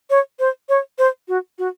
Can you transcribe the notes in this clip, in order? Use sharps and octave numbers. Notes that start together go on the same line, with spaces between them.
C#5
C5
C#5
C5
F#4
F#4